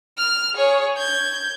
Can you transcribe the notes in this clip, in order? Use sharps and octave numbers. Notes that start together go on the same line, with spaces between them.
F6
G#4 C#5
G6 G#6